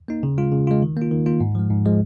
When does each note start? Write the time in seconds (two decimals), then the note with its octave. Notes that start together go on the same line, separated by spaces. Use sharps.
0.08 A#3 D#4
0.23 C#3
0.38 G#3 F4
0.52 C#3
0.67 G#3 F4
0.82 D#3
0.97 A#3 F4
1.11 D#3
1.26 A#3 F4
1.40 G#2
1.55 F3 G#3
1.70 G#2
1.85 F3 G#3